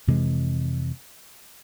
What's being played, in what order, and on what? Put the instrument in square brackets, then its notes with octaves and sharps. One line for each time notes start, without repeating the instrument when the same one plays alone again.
[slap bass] F2 C3 E3 G#3